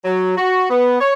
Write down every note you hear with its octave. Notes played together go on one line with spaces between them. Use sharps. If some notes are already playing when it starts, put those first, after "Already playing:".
F#3
F#4
B3
C#5